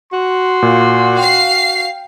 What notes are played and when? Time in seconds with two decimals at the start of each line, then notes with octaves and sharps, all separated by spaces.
0.13 F#4 C6
0.63 A#2 F5
1.18 F5 G5 C7